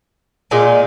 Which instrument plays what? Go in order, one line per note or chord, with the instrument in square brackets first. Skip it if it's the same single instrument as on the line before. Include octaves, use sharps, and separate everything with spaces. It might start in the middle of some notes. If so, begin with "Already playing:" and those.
[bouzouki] A#2 G#3 D#4